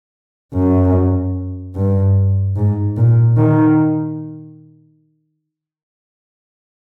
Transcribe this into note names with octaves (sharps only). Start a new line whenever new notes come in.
F#2
G2
G#2
A#2
D#3